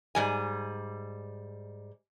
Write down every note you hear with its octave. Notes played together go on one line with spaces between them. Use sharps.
G#2 G3 G#5